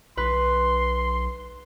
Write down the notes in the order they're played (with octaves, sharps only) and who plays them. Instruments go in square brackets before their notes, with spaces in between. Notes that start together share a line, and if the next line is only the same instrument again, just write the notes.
[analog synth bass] B1 [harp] B4 [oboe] C6